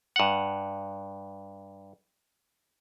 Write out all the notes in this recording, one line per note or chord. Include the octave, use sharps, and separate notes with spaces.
G2 F#5